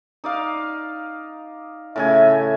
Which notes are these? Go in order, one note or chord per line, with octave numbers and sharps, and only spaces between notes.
D#4 D5 F5
A2 C#3 E5 G#5